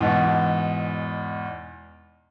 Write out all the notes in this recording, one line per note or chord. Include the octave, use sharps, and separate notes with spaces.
E2 G#2 B2